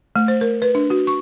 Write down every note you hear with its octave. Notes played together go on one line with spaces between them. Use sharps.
A3
C5
A#4
B4
D4
F#4
C#6